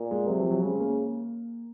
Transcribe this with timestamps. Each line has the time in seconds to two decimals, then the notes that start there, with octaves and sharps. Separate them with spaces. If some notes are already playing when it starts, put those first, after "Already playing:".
Already playing: A#2
0.11 G#3
0.28 C3 F#3
0.40 F3
0.50 F#3
0.62 C#3 G#3
0.80 A#3